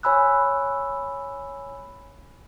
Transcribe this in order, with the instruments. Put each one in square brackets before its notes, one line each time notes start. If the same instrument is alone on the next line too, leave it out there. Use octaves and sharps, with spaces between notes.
[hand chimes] C#5 G#5 B5 E6 F#6